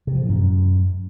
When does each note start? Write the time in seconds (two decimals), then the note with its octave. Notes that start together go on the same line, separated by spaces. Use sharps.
0.07 C3
0.14 F3
0.22 A2
0.29 F#2